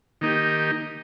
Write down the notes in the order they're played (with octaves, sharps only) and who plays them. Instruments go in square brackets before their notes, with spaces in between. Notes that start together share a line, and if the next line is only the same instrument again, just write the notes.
[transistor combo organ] D#3 A#3 D#4 G4